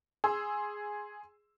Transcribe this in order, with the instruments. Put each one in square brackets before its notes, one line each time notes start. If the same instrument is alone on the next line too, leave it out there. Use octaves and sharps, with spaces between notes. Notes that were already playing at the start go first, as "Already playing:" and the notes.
[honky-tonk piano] G#4 C6 E6